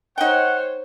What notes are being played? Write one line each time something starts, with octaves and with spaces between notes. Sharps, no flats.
D#4 C5 C#5 F#5 G5